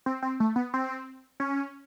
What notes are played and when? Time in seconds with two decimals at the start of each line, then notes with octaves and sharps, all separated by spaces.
0.06 C4
0.22 C4
0.40 A3
0.56 B3
0.74 C4
1.40 C#4